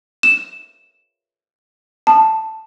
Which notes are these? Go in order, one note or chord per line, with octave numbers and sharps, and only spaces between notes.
E7
A5